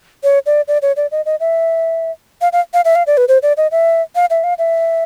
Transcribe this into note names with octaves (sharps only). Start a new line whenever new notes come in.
C#5
D5
D5
C#5
D5
D#5
D#5
E5
F5
F5
F5
E5
F5
D5
B4
C5
D5
D#5
E5
F5
E5
F5
E5